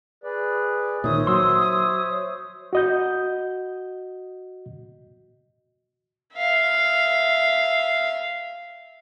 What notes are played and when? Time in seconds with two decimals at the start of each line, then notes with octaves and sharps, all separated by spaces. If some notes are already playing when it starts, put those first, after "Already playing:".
0.24 G#4 B4 D5
1.04 A#2 D#3 C5 C#5 E5 D#6
1.27 F#3 C6 E6
2.73 F#4 D#5 G6
6.35 E5 F5